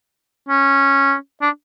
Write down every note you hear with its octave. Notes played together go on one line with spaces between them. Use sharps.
C#4
D4